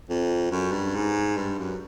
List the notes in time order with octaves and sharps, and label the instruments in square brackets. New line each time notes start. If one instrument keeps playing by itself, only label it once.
[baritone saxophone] F2
F#2
G2
G#2
G2
F#2